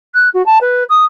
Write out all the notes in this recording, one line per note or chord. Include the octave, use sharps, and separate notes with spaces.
F#6
F#4
A5
B4
D#6